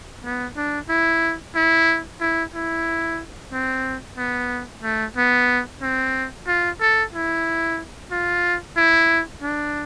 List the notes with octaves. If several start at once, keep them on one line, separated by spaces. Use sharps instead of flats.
B3
D4
E4
E4
E4
E4
C4
B3
A3
B3
C4
F4
A4
E4
F4
E4
D4